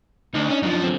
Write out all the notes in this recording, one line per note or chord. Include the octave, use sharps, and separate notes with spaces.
D2 D4 D#4
C#4
F#2 F3
D3 C4